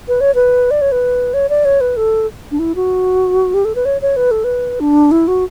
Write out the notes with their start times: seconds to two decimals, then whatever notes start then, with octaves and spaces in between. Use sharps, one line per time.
0.08 B4
0.21 C#5
0.35 B4
0.71 D5
0.81 C#5
0.92 B4
1.34 C#5
1.49 D5
1.65 C#5
1.81 B4
1.97 A4
2.51 D4
2.59 E4
2.76 F#4
3.54 G4
3.65 A4
3.75 B4
3.85 C#5
4.02 C#5
4.16 B4
4.31 A4
4.44 B4
4.80 D4
5.11 E4
5.28 F#4